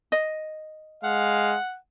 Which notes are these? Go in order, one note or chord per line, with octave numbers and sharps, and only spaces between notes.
D#5
G#3 F5 F#5